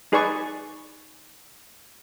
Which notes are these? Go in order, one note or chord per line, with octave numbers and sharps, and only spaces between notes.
D#4 G#4 B4 D5 G#5 C#6